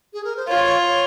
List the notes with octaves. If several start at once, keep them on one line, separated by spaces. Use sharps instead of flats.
G#4
A#4
C5
F4 C#5
C#5